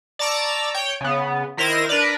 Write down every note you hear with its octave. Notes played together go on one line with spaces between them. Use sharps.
D5 A5 A#5 C#6 D6 E6
C#5 G5
C#3 B3
D#3 E4 A#4 C5 A#6 D#7
D4 A#4 B4 D5